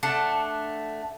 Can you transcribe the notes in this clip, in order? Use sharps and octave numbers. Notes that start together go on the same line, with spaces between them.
A3 D4 F#5 A5